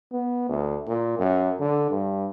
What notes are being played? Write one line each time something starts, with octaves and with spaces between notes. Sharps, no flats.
B3
D2
A#2
F#2
D3
G2